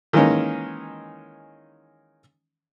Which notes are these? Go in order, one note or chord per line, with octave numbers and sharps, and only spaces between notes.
D#3 E3 G#3 A#3 C#4 D#4